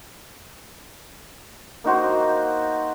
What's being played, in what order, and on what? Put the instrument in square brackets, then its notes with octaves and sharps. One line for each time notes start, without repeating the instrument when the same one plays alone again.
[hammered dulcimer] A#3 D#4 F#4 C5